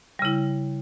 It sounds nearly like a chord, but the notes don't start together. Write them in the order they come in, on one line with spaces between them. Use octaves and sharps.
G3 C#3 E4